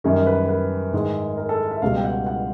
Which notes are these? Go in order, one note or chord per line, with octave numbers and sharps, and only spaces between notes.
F#2 D#3 G3 A#4
B4
B4
G#2 D#3 G#3
A#4
A4
E5
C#2 B2 G3 F5
G5
F#5
F#5